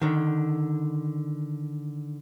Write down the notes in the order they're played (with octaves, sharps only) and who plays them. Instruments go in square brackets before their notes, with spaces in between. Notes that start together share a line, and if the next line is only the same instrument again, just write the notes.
[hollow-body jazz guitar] D3 D#3